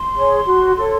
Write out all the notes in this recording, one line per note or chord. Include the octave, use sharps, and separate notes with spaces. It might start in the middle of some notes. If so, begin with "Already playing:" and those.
Already playing: C6
G#4 C#5
F#4
A4 C#5